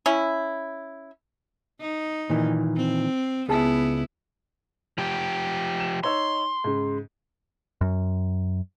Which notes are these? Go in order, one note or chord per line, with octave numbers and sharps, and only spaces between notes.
C#4 E4
D#4
A#2 D#3 E3
C4
C#2 B3 E4 G#4 A5
F3 G4
E7
D#4 C#5 C6 E6
G#2 C#3
F#2